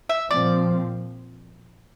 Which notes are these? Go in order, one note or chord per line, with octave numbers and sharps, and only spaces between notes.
E5
A#2 F3 C4 D5